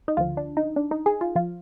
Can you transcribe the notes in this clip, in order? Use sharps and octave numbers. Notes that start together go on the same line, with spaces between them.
D#4
D2 D3 F3 F4
D4
D#4
D4
D#4
G#4
F4
F3 F4